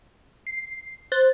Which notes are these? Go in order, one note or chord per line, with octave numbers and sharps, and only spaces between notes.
C7
C5 F#6 A6